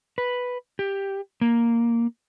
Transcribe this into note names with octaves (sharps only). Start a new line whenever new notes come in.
B4
G4
A#3